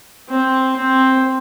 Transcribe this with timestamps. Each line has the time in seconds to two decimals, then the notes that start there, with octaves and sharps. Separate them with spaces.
0.29 C4
0.76 C4